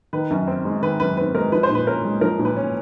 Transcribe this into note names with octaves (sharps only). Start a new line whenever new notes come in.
D#3 B4
F#2
C4
G#3
D#3 B4
F#2 B4
C4 B4
G#3 A#4
F3 B4
C5
A#2
B4
C#4 A#4
G#3
F3 A#4
A#2
B4
C#4